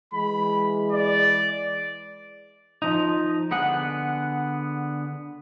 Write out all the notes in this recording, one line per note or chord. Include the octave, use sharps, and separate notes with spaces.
E3 G#3 B5
D5
F3 D#4
D3 B3 G#4 F#5